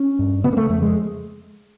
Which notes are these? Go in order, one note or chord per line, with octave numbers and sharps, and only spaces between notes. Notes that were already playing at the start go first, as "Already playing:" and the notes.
Already playing: C#4
G2
C#3 B3
A#3
A3
F2 A3
G#3